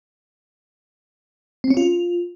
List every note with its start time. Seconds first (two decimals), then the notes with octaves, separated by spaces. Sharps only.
1.64 C4
1.70 C#4
1.77 F4